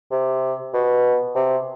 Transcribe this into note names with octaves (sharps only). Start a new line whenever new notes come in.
C3
B2
C3